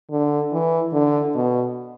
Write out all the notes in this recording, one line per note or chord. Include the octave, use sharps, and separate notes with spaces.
D3
E3
D3
B2